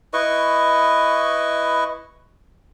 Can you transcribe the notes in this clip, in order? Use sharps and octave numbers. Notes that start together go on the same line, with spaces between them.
E4 B4 D#5 C#6